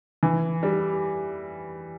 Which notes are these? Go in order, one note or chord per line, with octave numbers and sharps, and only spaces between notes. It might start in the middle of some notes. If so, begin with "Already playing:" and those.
E3
G3